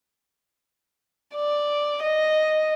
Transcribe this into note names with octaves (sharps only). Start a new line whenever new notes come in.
D5
D#5